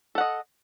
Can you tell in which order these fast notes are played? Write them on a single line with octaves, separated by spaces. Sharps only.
A4 F#5 D#5